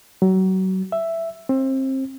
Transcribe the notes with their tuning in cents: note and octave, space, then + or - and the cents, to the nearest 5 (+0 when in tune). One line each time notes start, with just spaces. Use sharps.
F#3 +30
E5 +5
C4 +25